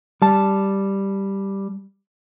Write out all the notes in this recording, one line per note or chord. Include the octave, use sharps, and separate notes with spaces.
G3 A5